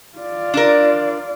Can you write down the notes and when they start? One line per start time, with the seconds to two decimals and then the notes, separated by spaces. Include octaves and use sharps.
0.18 F4 D5
0.54 D4 A#4